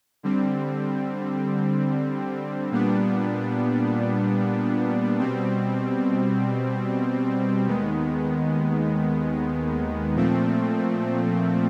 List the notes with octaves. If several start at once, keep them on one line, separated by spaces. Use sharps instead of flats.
D3 G3 C4
A#2 G3 B3 D4
B2 G3 C4
D#2 D#3 G#3 B3
A#2 F3 A3 C4